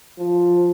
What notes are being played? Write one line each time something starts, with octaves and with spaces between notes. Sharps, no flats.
F3